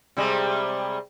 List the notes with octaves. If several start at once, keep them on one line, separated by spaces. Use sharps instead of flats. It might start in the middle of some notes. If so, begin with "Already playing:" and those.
C3 G3 G#3